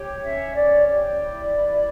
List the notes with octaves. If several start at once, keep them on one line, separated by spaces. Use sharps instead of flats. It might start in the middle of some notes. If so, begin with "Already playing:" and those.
Already playing: G4 C#5
C#4 E5
C#5 D5
G4 D5
E4
B4